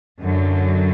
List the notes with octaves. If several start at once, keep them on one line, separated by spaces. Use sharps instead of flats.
F#2 D3 F#3